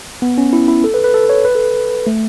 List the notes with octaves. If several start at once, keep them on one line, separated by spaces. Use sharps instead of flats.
B3
C#4
E4
E4
A4
B4
B4
A4
C#5
B4
A4
A3